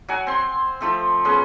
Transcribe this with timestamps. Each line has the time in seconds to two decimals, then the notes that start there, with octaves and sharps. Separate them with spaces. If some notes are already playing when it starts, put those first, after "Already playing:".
0.08 F#3 F#5 G#5
0.27 C4 C6
0.81 F3 A3 C4
1.25 B3 C#4 G#4 C6